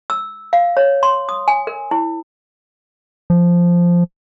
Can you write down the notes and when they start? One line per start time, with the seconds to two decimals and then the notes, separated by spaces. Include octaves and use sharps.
0.10 E6
0.53 F5
0.77 C#5
1.03 C6
1.29 D#6
1.48 G#5
1.67 A#4
1.91 E4
3.30 F3